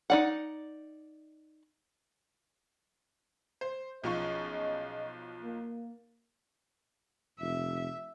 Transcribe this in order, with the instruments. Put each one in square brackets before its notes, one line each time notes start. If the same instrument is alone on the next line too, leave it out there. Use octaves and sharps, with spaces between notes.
[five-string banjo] D#4 D5 F#5
[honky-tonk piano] C5
[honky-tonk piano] B1 F3 C#6 [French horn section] C#4 G#4 D#5
[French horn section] A#3
[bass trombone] F1 [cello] E5